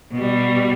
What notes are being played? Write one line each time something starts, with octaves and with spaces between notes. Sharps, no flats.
B2 G3